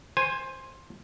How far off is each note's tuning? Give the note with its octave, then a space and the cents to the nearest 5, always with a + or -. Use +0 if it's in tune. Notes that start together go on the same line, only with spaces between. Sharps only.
C5 +15 G#5 -10